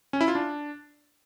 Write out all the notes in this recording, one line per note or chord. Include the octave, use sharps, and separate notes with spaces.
C#4
E4
F4
D4